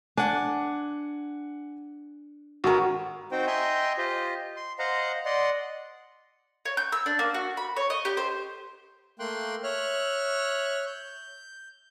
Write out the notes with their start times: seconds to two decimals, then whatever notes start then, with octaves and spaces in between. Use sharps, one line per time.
0.17 D4 F#5 G#5
2.64 G#1 F#4 A#4 C#6
3.32 C4 D#4 F#4 C5 G5
3.47 D#5 E5 G5 G#5 A#5 C6
3.98 F4 G4 C5 D#5
4.56 C6
4.79 C5 D#5 F5 F#5 A#5
5.25 D5 D#5 F#5 C6
6.65 C#5
6.77 G6
6.92 E6
7.06 D4
7.19 A#3
7.34 F#4
7.57 B5
7.77 C#5
7.90 D#5
8.05 G4
8.17 C5
9.19 A3 A#3 G5 C6 F#6
9.63 C#5 E5 F6 F#6
10.86 G6